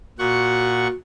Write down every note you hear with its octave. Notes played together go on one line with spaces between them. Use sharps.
A#2 F#4 F#5 C#6